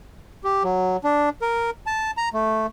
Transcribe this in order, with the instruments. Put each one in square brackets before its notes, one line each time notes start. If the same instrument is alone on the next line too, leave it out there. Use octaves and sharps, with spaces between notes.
[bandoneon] G4
F#3
D4
A#4
A5
A#5
A3